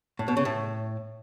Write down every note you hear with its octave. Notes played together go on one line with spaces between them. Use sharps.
A2
B2
C#3
A2